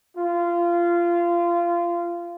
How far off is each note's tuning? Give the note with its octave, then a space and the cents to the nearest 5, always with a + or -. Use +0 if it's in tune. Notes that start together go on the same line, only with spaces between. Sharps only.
F4 -20